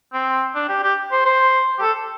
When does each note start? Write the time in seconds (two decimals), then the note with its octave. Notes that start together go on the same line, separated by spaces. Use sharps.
0.13 C4
0.55 D4
0.69 G4
0.83 G4
1.12 C5
1.25 C5
1.79 G4
1.82 A4